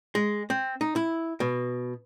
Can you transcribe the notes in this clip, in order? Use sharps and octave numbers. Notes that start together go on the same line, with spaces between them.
G#3
C4
D#4
E4
B2